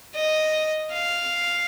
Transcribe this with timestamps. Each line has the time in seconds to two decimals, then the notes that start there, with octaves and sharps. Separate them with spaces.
0.15 D#5
0.92 F5